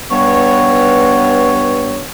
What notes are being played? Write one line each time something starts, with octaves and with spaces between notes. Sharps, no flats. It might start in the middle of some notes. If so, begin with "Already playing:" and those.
G2 B3 C#5